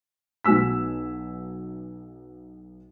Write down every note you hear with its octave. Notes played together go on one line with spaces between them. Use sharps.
B1 F#4 G#5 E6 B6